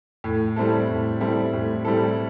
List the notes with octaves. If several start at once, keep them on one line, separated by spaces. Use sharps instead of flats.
A2
G3 C4 E4 A4
A2
G3 C4 E4 A4
A2
G3 C4 E4 A4